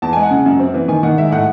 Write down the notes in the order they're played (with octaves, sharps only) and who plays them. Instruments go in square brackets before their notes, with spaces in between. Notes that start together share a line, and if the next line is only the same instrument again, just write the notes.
[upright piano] E2 A5
G#3 G#5
F#5
C#3 G#5
F#2
C4
E3
D#3 G#5
D#3 F#5
G#3 E5
A2 F#5